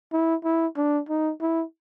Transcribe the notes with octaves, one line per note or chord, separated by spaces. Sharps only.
E4
E4
D4
D#4
E4